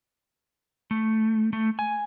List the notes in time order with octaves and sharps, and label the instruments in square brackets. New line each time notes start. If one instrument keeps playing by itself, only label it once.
[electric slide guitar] A3
A3
G#5